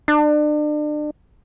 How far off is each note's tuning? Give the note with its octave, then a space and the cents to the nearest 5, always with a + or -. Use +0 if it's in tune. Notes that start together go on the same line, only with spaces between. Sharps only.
D4 +35